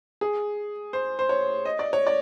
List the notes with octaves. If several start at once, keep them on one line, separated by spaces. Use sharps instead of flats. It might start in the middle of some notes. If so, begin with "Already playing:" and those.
G#4
C5
C5
C#5
D#5
D5
C#5
D5